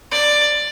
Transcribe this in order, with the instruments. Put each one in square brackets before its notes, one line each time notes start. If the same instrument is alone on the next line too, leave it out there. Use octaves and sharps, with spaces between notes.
[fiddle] D5